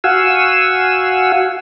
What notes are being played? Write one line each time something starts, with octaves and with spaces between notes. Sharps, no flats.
F#4 F5 F#5 G#5 E6